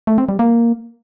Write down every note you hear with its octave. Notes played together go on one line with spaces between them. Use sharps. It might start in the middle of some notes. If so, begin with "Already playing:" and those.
A3
C4
G3
A#3